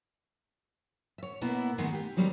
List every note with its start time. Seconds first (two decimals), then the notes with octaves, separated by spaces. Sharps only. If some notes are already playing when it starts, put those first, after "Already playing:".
1.18 C#5 E5
1.41 B2 A#3 B3 E4
1.78 D#3 G#3 A3 B3 G#4 A#4
1.93 G4
2.17 D#3 F#3 G3 A#3 C4 D#4